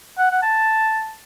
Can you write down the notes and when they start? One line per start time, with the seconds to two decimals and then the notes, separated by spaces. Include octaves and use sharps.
0.18 F#5
0.30 F#5
0.42 A5